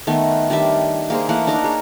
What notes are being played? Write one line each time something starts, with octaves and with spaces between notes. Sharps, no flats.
D#3 A3 B3
D#3 G3 D4 E5
A#3 G#4 C5
E3 A3 A#3 F#5
D4 D#4 A#4
G#4 C#5